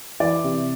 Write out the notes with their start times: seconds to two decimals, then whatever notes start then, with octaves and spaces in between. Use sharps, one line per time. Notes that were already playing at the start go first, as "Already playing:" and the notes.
0.20 E3 D5
0.44 C3